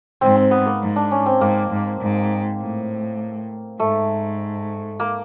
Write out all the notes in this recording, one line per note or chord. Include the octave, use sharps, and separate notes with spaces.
G#2 C4
C4
B3
A#3
G#2
D4
C#4
C4
G#2 A#3
G#2
G#2
A2
G#2 A3
A#3